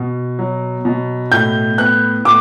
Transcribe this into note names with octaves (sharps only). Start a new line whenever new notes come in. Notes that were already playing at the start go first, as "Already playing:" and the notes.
Already playing: B2
F#3
B2
A2 G6
B3 F#6
A2 D6